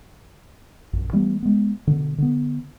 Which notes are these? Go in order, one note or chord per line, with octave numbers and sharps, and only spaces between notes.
A#1 F#2
E3 G3 A3 B3
G#3 B3
B2 D3
D3 B3